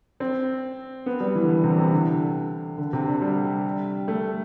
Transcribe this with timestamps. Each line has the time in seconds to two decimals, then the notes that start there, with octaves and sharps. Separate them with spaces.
0.20 C4
1.06 B3
1.20 G3
1.35 E3
1.45 D3
1.49 E3
1.64 C3
1.78 C3
1.92 D3
2.78 D3
2.93 C3
3.08 D3
3.22 G3
4.08 A3